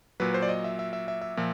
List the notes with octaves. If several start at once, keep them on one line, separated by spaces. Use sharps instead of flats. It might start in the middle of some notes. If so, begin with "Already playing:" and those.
A#2 F#3 B4
C5
D5
D#5
E5
E5
E5
E5
E5
A#2 F3